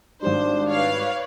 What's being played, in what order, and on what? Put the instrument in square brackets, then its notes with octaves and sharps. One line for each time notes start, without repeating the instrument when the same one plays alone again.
[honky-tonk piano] G#1 G3 [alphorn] D4 [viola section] C5
[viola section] B4 C#5 D5 [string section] F5